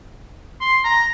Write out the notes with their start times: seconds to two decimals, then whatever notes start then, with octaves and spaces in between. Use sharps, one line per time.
0.61 C6
0.84 A#5